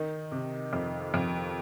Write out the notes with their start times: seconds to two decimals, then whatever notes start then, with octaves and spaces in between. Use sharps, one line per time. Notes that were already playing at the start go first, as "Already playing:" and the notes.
Already playing: D#3 D#4
0.32 C3
0.73 F2
1.14 F2